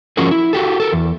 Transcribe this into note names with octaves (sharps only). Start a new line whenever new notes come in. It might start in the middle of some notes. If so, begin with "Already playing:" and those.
F3 C#4 F4 F#4 G#4 A#4
E4
F#4 G4 A4
A4 A#4
E2